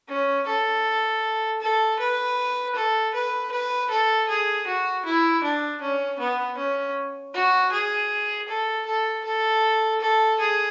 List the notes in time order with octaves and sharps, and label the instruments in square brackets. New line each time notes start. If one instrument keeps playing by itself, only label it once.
[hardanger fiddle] C#4
A4
A4
B4
A4
B4
B4
A4
G#4
F#4
E4
D4
C#4
B3
C#4
F#4
G#4
A4
A4
A4
A4
G#4